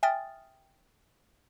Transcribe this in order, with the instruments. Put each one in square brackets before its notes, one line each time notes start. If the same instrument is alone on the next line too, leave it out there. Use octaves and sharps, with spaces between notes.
[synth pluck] E5 G5 G#5 D#6 F6 A6